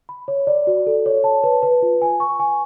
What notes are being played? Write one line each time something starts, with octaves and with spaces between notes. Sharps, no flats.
B5
C#5
D5
F#4
A4
C#5
A5
B4
B4
F4
G#5
C#6
G#5